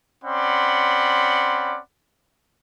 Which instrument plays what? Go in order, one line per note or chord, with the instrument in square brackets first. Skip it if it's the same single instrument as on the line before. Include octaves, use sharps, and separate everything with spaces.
[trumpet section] C4 C#4 D5 F#5 B5 C6